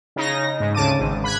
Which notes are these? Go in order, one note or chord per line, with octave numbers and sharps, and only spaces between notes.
C#3 D#4 A#6
G#2
D2 C#3 A5 D6 D#7
G#1 G#2
B5 F#6 G#6